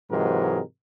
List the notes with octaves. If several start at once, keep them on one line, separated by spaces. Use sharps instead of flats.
G#2 C3 E3 F#3 G#3 A#4